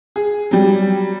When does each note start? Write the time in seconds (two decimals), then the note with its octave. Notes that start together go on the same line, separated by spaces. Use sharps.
0.16 G#4
0.51 F#3 G3